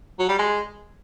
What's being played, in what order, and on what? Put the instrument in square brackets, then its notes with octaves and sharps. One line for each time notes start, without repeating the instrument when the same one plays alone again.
[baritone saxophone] F#3
G3
G#3